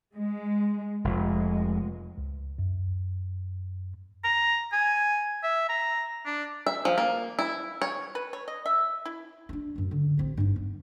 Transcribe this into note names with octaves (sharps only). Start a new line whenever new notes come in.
G#3
F1 G#3
C#2
F#2
A#5
G#5
E5
A#5
D4
E5
F3
A#3
E4
C#5
B4
C#5
D#5
E5
E4
C#4 D4
A1 F#2
D3
A1 C4
G2 D#4
B3